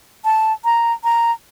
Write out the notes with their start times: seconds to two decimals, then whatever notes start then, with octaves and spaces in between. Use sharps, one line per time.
0.25 A5
0.65 A#5
1.04 A#5